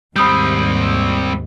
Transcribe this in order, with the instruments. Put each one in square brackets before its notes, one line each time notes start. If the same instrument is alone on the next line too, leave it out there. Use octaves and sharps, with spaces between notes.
[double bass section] D#2 G#2 [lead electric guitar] G3 C4 [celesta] B5 D#6 G6